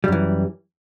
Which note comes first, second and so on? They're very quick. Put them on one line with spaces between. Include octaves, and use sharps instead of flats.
G3 F#2 E3